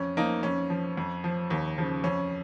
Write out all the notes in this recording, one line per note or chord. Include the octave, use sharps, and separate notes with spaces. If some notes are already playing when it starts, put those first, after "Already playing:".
Already playing: F2 C#4
F3 A#3 D#4
F2 C#4
F3
F2
F3
D#2
C#3 F3
F2 C#4